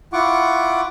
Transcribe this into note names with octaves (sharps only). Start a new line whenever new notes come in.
E4 F4 F#5 C#6 D6